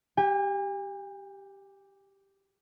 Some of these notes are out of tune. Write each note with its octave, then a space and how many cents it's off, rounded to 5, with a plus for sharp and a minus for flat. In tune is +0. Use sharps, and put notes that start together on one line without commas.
G4 +0 G#5 -45